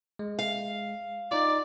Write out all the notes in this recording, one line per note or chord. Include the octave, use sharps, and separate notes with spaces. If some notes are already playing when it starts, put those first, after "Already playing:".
G#3
F5
D#4 F4 D5